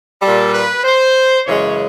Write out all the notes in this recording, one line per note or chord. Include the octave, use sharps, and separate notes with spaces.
A#2 G3 A4
B4
C5
F#2 C#3 E3 G#3 C#5